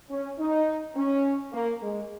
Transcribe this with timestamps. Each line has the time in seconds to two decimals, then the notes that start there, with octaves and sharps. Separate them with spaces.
0.10 C#4
0.39 D#4
0.96 C#4
1.53 A#3
1.82 G#3